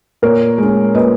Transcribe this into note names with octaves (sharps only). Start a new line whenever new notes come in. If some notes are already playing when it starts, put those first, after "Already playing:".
A#2 A#4 C#5
G#3 C#4
A#2 B4 D#5